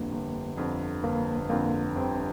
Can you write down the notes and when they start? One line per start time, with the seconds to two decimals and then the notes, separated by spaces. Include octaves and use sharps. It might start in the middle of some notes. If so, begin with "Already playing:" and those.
Already playing: G1 F2 D3 A#3
0.12 G1
0.57 F2 D3
1.03 G1 A#3
1.49 F2 D3 A#3
1.96 G1 C4